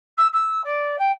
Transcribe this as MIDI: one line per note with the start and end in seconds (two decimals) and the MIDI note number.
0.17 0.27 88
0.33 0.61 88
0.64 0.98 74
0.98 1.11 79